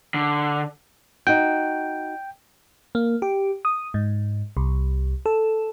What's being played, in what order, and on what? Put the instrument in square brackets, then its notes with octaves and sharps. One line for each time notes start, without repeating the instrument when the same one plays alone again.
[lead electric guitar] D3
[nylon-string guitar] D#4 F#4 [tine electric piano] G5
[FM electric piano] A#3
G4
D#6
G#2
C2
A4